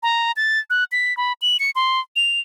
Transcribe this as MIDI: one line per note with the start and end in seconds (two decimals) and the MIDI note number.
0.03 0.32 82
0.36 0.59 93
0.70 0.84 90
0.92 1.16 95
1.17 1.33 83
1.42 1.57 102
1.60 1.71 97
1.76 2.00 84
2.16 2.40 101